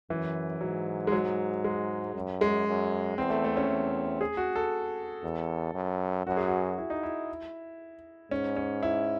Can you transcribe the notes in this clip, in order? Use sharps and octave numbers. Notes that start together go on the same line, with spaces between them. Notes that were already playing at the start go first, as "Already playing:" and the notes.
F#2 E3
G#2 F#3
G#3
F#3
G#3
F#2
G#3
F#2
E2 C4
A3
A3
C#4
E2
G#4
F#4
A4
E2
F#2
F#2 F#4
G#4
F#4
E4
D#4
E4
G#2 C#4
C#4
E4